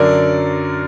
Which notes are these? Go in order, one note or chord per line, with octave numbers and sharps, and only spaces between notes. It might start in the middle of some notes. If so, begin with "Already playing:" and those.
Already playing: F#2 D3 F#3 A#4 D5